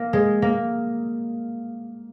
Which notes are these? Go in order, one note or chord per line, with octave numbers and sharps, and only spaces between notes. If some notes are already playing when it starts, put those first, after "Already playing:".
Already playing: A#3
G#3
A#3